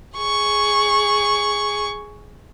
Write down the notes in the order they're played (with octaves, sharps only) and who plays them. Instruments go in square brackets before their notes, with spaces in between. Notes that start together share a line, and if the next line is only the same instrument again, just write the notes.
[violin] G#4 C#6